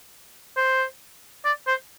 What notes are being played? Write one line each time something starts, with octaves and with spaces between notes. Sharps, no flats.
C5
D5
C5